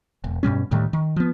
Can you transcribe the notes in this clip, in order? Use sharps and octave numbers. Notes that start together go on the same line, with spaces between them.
E1
G2 B2 G3 C#4
D2 A2 D#3 G3
D#3
F3 B3